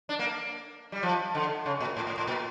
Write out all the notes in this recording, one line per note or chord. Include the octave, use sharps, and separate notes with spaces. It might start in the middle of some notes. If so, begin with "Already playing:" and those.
D4
A#3
G3
F3
D3
C#3
A#2
A2
A2
A2
A#2